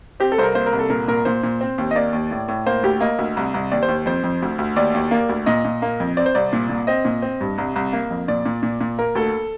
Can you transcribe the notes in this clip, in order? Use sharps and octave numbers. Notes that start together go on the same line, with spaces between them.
C4 G4
A4
C2 C5
A#4
A#3 C5
A#4
C2
A4
A#2 A#4
A#2 A#4
A#2 C5
A#2
C4
D#2
D#5
A#3 D5
D#2
A2
A2
A#3 C5
D2 G4
A#3 D#5
D2
C2
C2
D#2 D5
C5
D#2
F2 C5
F2
D2
D2
D#2 D5
D#2
A#3
D2
A#2 D#5
A#2
A#3
F2
C4 D5
C5
C2 D5
A#2
A#2
C4 D#5
A#2
C4
G2
C2
C2
A#3
F2
A#2 D5
A#2
A#2
A#2
A#3 A#4
D2 A4